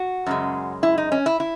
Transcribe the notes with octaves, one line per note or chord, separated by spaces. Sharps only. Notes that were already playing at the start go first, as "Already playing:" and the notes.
Already playing: F#4
F#2 C#3 G#3
E4
D#4
C#4
E4
E4